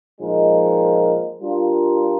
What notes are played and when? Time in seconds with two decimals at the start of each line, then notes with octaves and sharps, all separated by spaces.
0.20 A#2 F3 G#3 D#4 A#4
1.40 G3 D4 F4 A#4